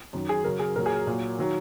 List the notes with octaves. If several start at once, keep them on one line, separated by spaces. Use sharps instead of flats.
F#2 D#3 F#3
G#4
F#2 C#3 F#3 A#4
G#4
A#2 F#3 A#4
G#4
A#2 F#3
D#3 F#3